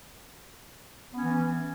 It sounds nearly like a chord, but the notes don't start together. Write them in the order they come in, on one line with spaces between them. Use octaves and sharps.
B3 C#4 E3